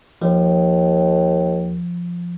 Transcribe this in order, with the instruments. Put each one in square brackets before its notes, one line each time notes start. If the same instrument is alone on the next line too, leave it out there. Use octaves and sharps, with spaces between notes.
[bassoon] D#2 [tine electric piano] F3